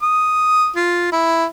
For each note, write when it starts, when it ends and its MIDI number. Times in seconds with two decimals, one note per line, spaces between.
0.03 0.68 87
0.76 1.10 65
1.12 1.45 64